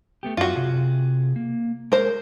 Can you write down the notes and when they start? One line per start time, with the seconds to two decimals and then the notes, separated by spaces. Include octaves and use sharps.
0.23 A3 B3 G4
0.37 F#2 F4 F#4
0.55 C3 G#4
1.36 A#3
1.92 G#3 A#4 C5